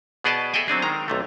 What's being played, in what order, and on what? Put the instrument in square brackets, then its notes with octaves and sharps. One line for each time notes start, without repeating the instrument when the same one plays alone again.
[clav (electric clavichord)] B2 B3 G#4 D5 D#5 A5
G#4 A4 D#5 E5 G5 G#5
F#3 C4 D4 G#4
D#3 G#3 A#5
B1 C3 A3